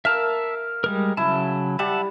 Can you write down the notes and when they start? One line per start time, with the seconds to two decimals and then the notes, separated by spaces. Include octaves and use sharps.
0.05 A#4 E5 F5 A5 E6
0.84 G3 G#3 A#4
1.17 C#3 F#3 E4 A5
1.79 G3 E5 F#5 A5